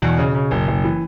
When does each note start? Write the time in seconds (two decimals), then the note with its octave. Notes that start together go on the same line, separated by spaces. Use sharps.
0.02 E2 B2
0.18 C#3
0.35 C#3
0.51 F#1
0.68 F#1
0.84 E3